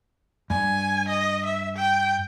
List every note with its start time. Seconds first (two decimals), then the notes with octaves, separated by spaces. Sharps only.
0.50 G2 G#5
1.08 D#5
1.45 E5
1.76 G5